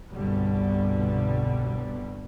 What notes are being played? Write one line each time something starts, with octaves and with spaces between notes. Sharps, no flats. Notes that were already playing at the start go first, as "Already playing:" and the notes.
G1 C2 B2 D3 G3 B3